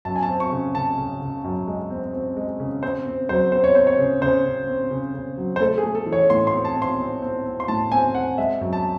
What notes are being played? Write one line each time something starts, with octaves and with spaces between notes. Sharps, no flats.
F#2 A5
G#5
A5
C4
C#6
C#3
C#3 A5
C#3
C#3
F#2
G#3
C4
C4
G#3
C#3
C4 C5
C4
F#3 C5
C4 C5
C#5
C4 C5
C#5
C#3
C#3 C5
C#3
C4
C#3
C#3
F#3
C5
A3 A4
G#4
A3
A4
E3
C#5
A2 C6
C6
C4
A5
C4
C6
C4
C4
C4
C6
A2 A5
C4 G#5
C4 F#5
G#3 E5
F#2
A5